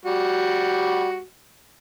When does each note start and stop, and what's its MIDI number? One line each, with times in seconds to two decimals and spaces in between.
0.05 1.21 55
0.05 1.21 66